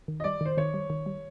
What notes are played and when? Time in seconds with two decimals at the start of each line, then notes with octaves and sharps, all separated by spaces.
0.08 D#3
0.20 D#5
0.24 G3 D5
0.41 D#3 C5
0.57 D#3 C#5
0.74 G3
0.90 D#3
1.06 G3